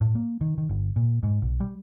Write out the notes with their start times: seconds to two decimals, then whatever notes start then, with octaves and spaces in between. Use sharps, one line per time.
0.01 A2
0.15 A#3
0.41 D#3
0.58 D#3
0.69 G1
0.96 A#2
1.23 G#2
1.42 B1
1.60 G3